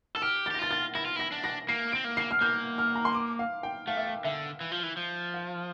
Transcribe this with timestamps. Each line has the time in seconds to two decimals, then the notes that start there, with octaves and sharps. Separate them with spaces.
0.15 A4 E6
0.22 G4 F6
0.46 A6
0.51 G4
0.54 A#6
0.59 F4 A6
0.71 A6
0.95 E4 A#6
1.05 F4
1.16 E4 A#6
1.32 D4
1.44 A#6
1.68 A#3 C7
1.92 C4 D7
2.04 A#3
2.17 C7
2.31 F6
2.41 A#3 G6
2.78 F6
2.95 A#5
3.05 C6
3.14 D6
3.39 F5
3.63 G5
3.87 A3 F5
3.97 E5
4.07 F5
4.24 D3 E5
4.61 E3
4.72 F3
4.83 E3
4.97 F3
5.34 F5